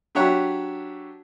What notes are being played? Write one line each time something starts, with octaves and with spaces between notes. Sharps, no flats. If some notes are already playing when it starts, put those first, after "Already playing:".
F#3 D4 G4 C#5 E5 F#5